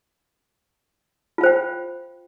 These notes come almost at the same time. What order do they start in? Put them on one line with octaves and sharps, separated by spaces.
F4 F5 C5 G5